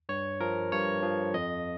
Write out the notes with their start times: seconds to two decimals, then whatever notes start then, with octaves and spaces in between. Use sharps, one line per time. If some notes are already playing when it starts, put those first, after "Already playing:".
0.09 G2 C#5
0.40 F3 A#4
0.72 G2 C#5
1.03 F3
1.34 F2 D#5